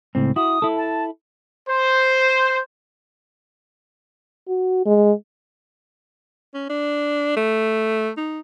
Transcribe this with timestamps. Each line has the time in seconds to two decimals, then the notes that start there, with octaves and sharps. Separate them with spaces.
0.15 C#2 A2 C4
0.36 E4 F#4 D#6
0.62 E4 A4
0.77 A5
1.69 C5
4.48 F#4
4.85 G#3
6.54 C#4
6.70 D4
7.37 A3
8.17 D#4